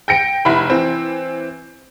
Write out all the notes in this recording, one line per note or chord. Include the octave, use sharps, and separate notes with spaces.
G5 A#6 C#7 D7
F1 E4 B5
E3 C4